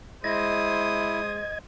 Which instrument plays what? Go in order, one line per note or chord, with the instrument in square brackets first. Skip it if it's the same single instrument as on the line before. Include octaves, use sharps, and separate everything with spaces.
[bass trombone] G#3 [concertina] E4 [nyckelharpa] C5 D#6 [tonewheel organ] D#5 G#6